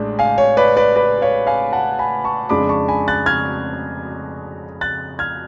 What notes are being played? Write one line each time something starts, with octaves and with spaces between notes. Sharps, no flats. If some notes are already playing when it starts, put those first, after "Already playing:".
Already playing: A1 A2 G#3 D4
F5 G#5
C#5
B4 D5
B4 D5
B4 D5
C#5 F5
F5 G#5
F#5 A5
G#5 B5
A5 C#6
F2 C#3 G#3 D4 B5 D6
A5 C#6
G#5 B5
F#6 A6
F6 G#6
F#6 A6
F6 G#6